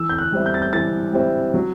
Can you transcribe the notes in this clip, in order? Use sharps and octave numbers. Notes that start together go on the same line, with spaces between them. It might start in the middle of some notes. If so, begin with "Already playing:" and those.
Already playing: E3 E6
G6
F#6
G3 C4 E4
G6
A6
G6
E3 A6
G3 C4 E4
F#3